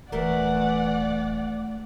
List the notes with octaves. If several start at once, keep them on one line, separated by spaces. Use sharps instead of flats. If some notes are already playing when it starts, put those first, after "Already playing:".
D#1 E3 A3 F4 A#4 D5 F#5